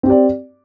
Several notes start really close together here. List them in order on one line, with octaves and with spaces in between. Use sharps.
C4 G4 D5